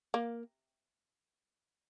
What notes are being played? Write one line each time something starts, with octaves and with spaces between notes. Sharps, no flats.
A#3